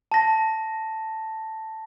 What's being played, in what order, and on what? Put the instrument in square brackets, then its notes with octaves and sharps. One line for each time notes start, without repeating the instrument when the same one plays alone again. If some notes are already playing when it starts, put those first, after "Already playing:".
[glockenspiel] A5 A#6